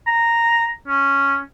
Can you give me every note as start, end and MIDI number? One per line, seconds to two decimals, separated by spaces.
0.07 0.71 82
0.88 1.39 61